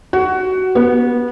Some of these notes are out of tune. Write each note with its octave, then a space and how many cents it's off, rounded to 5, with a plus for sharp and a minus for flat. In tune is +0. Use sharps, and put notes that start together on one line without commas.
F#4 +15
B3 -20